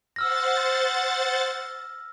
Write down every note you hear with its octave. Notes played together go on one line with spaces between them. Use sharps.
C5 F#5 E6 F6 A6 A#6